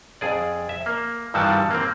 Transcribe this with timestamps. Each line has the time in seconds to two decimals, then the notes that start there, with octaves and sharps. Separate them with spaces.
0.21 F2 G#4 D5
0.69 E5
0.86 A#3
1.34 G2 D#3 E3 G3 F#4 A5
1.71 A#3 C4